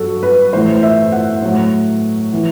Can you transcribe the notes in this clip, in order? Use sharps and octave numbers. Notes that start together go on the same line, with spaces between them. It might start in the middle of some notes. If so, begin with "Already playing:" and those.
Already playing: G2 F#3 F#4 A4
B4
A2 E3 C5
E5
F#5
A2 F#3
E3